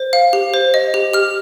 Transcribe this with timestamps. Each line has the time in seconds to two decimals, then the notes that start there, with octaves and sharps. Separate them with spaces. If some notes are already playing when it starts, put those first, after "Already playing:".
Already playing: C5
0.13 F5
0.33 G4
0.54 C5
0.74 D#5
0.94 G4
1.14 G4 F6